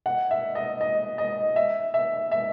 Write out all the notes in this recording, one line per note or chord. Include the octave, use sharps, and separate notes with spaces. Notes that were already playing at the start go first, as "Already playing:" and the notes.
F#5
E5
D#5
D#5
D#5
E5
E5
E5